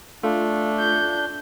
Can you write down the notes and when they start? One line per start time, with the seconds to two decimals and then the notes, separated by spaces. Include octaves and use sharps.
0.23 A3 D4 F4
0.80 G6